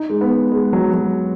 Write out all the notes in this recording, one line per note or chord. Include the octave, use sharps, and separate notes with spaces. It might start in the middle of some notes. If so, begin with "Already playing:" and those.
Already playing: D#4
G#3
B3
G#3
F#3
F#3